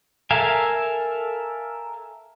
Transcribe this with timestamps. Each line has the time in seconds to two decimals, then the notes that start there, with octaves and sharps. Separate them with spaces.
0.31 A4 A#4 E5 F5 G#5